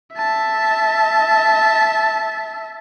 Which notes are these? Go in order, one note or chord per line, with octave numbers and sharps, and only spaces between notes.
E5 A5